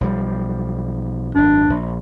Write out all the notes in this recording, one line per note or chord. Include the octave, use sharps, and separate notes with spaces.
B1 F3 G3
G#1 F#2 D4
A#1